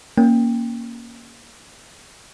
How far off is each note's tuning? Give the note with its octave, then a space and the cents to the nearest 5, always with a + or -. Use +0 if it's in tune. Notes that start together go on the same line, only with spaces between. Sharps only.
A#3 +5 C#4 +0 G5 +20